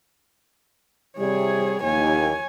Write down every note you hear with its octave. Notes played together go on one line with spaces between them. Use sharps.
C3 G3 G#4 C#5
D#2 C#5 G#5